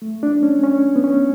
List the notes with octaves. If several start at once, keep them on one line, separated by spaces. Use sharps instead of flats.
A3
D4
C#4
C#4
B3
C#4